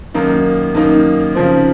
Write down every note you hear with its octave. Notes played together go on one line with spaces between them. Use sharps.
F#2 D#3 A#3 D#4
F#2 D#3 A#3 D#4
C#3 F3 C4